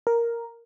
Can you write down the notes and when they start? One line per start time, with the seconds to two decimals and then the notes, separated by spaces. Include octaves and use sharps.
0.07 A#4